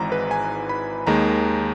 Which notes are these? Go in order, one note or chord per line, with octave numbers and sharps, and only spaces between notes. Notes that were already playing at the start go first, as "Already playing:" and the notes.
Already playing: G#1 G#2 E3 A#5
B4
G#5
B5
D#2 D#3 G#3 A#5